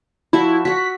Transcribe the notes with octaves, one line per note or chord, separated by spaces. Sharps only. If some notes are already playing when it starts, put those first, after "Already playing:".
F3 E4 F#4 E5
F#4 F#5 B6